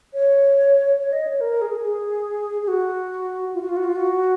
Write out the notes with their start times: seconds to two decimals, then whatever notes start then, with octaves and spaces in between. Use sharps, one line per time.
0.14 C#5
0.99 C#5
1.13 D#5
1.27 C#5
1.41 A#4
1.61 G#4
1.69 A#4
1.76 G#4
2.62 G#4
2.68 F#4
3.54 F4
3.62 F#4
3.69 F4
3.77 F#4
3.84 F4
3.96 F#4